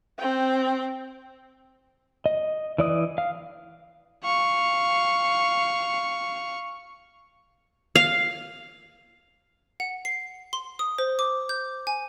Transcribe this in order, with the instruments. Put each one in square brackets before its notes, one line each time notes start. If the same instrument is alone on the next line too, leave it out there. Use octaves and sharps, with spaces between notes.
[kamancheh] C4 G5
[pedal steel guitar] D#5
E3 D5 D#6
F5
[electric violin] F5 C#6
[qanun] F5
[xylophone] F#5
C7
C6
D#6
C5
D6
G6
G#5